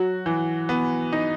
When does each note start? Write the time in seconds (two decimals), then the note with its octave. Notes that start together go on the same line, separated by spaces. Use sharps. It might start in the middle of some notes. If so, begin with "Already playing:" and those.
Already playing: F#3 F#4
0.26 E3
0.69 B3
1.12 D#4